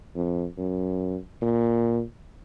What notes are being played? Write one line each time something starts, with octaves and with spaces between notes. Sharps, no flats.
F2
F#2
A#2